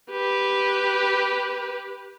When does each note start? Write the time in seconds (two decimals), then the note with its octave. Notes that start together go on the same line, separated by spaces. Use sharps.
0.11 G4 B4